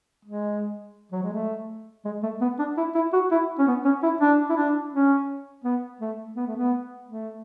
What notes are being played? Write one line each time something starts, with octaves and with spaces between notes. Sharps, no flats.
G#3
F#3
G#3
A3
G#3
A3
B3
D4
E4
E4
F#4
E4
C#4
B3
C#4
E4
D4
E4
D4
C#4
B3
A3
B3
A3
B3
A3